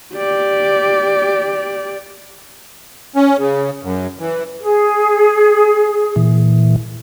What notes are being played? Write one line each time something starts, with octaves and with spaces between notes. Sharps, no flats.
G4 D5
C#4
C#3
F#2
E3
G#4
A#2 E3